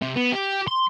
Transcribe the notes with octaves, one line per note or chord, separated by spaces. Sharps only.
C3
B3
G4
C6